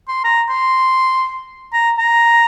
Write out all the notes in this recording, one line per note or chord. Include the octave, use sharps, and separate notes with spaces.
C6
A#5
C6
A#5
A#5